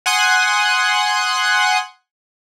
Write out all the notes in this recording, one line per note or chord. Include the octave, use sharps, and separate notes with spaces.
F#5 G#5 C6 D#6 F#6